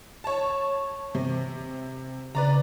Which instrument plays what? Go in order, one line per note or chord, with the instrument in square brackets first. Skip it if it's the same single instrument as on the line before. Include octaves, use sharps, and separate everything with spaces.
[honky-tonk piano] C#5 A5
C3
[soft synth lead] C#3 [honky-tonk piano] B4 D5 A#5